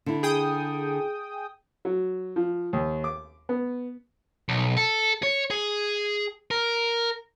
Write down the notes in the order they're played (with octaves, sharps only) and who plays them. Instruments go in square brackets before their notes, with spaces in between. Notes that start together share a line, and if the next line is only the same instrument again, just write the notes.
[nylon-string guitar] D3 E4
[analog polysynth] G#4 G5 D#6
[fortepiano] F#3
F3
D#2
D6
B3
[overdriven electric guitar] B1
A4
C#5
G#4
A#4